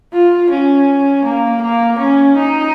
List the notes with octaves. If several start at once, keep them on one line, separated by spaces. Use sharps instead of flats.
F4
C#4
A#3
A#3
C#4
D#4